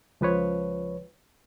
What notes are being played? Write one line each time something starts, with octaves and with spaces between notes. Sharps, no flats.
C#2 F3 B4 C#5